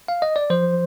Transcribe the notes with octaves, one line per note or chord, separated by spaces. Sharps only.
F5
D#5
D5
F3 C5